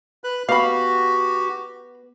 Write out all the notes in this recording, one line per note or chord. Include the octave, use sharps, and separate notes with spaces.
B4 F#6
B3 F#4 G4 F5 B5